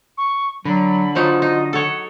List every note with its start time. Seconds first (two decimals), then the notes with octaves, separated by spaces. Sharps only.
0.18 C#6
0.65 D3 F#3 B5
1.15 F3 F#3 D#4 F4
1.42 D#4 D#5
1.73 A4 C#5 F#5